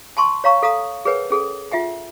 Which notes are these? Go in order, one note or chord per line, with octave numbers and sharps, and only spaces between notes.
G#5 A5 C6 C#6
C#5 F5 A#5 C#6
A4 F5 A#5 D#6
G#4 A#4 B4 C#5 F#5 G#5
C#4 G#4 A4
F4 E5 F#5 G#5